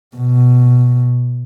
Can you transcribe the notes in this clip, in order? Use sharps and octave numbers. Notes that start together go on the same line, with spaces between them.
B2